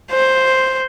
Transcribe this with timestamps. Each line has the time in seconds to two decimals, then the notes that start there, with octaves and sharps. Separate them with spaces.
0.11 C5